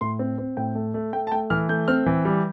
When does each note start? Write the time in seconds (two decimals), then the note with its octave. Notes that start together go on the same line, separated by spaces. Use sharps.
0.01 A2 C6
0.19 C4
0.38 C4
0.57 A2 G5
0.75 A3
0.94 A3
1.13 A3 G5
1.27 A5
1.32 A3 G5
1.50 E3 F6
1.69 A3 G6
1.88 C4 F6
2.06 E3
2.25 G3